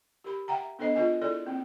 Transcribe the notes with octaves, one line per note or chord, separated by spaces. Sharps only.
G4 A#4 B5
E5 F#5 G5 A#5
B3 D4 A4 C5 D#5
F4 G#4 A#4 D#5 G#5
E4 G#4 A4 D5
A#3 C4